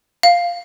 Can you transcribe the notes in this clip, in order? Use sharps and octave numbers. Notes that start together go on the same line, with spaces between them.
F5